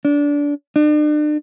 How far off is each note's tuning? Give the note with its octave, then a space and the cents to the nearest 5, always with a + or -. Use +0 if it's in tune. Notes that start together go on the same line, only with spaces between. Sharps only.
D4 -20
D4 +40